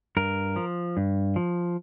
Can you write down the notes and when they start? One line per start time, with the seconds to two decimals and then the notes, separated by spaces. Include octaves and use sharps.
0.17 G2 A#4
0.56 F3
0.97 G2
1.36 F3